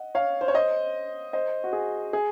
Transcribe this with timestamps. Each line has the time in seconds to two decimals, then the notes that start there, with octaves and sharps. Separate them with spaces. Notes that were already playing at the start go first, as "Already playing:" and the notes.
Already playing: D#5 F#5
0.15 C#5 F5
0.41 C5
0.48 C#5
0.54 C5 D#5
1.33 C5 D#5
1.64 F#4
1.73 G#4
2.13 G#4